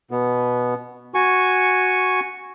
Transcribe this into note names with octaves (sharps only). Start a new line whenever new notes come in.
B2 B3
F#4 G#5 C#6